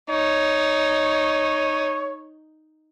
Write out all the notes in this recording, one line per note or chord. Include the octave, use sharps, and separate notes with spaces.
D#4 C#5